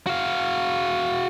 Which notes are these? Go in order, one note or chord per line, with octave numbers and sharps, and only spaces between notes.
F#4 F5